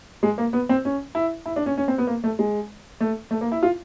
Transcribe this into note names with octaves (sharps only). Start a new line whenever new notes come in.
G#3
A#3
B3
C4
C#4
E4
E4
D4
C#4
C#4
C4
B3
A#3
A3
G#3
A3
A3
A#3
E4
F4